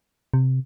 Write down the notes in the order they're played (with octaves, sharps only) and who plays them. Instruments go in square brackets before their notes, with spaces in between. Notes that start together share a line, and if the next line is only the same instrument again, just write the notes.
[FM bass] C3